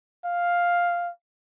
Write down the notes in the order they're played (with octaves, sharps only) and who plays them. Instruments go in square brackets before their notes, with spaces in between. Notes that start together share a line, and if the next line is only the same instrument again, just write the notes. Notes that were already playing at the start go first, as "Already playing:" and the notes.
[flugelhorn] F5